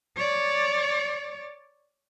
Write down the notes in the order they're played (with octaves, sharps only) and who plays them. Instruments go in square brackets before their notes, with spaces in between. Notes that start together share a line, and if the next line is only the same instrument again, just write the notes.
[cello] C#5 D5